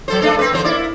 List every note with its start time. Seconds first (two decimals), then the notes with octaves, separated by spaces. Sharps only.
0.08 F#3 A4 C5
0.21 A3 D4 A4
0.39 C4 B4
0.51 E2 D3 C5
0.64 A#3 E4 D5